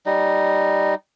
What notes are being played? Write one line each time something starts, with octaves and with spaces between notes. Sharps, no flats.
G3 D#4